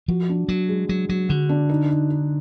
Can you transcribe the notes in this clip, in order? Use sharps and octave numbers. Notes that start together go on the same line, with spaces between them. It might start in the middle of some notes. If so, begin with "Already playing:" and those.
F3 F#4
D4
F#3 F#4
G#3
F#3 F#4
F#3 F#4
D3 F#4
D4
D#4
D#4
D#4